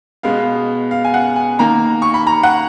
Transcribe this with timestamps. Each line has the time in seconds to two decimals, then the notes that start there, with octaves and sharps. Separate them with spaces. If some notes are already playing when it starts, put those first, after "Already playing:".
0.23 B2 G#3 B3 F5
0.91 F5
1.04 G#5
1.14 F#5
1.36 G#5
1.59 D#3 A#3 A#5
2.02 C#6
2.14 B5
2.27 A#5
2.43 F#5